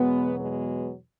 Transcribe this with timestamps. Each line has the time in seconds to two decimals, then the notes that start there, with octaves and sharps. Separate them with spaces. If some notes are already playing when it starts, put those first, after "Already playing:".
Already playing: E2 B2 F#3 G#3 B3
0.39 G#3 B3